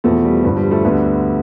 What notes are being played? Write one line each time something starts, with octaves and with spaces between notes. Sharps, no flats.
E2 B2 F3 A3
G3
G2 D3 F3
G3
F3 A3
D2 D3 G3 B3